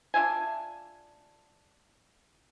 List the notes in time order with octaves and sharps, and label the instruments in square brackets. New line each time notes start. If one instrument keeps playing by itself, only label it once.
[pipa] D4 F4 E5 G#5